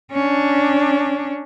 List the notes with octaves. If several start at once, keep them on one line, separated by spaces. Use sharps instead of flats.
C#4 D4